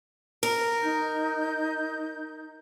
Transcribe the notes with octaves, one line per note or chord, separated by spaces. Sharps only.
A#4
D#4 G6